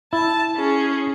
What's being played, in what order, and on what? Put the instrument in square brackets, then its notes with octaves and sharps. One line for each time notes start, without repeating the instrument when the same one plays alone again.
[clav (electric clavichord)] E4 [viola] A5
[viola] C#4 G#4